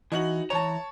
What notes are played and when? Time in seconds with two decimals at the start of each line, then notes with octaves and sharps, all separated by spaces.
0.12 E3 D#4 F#4 F#7
0.50 E3 C#5 A5 A#5